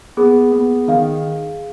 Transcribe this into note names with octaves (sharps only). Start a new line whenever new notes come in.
B3 G#4
B3
D#3 F5